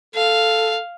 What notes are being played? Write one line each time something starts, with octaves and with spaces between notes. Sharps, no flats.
A4 F5